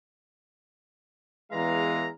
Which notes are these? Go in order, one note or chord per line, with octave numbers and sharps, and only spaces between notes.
E2 E3 G#3 F5 A#5